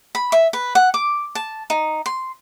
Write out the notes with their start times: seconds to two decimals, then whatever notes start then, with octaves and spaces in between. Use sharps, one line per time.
0.15 B5
0.32 E5
0.53 B4
0.75 F#5
0.94 D6
1.35 A5
1.70 D#4
2.06 C6